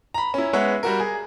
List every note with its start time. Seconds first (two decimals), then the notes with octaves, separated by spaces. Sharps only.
0.14 A#5 B5
0.34 C#4 E4
0.53 G#3 B3 C#5 E5 F#5
0.83 G3 F#4 A#4
1.00 G#4